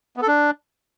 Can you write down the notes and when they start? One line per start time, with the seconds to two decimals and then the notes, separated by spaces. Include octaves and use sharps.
0.17 B3
0.22 A4
0.27 D4